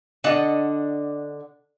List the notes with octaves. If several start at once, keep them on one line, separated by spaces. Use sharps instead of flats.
D3 D4 D#5 F#5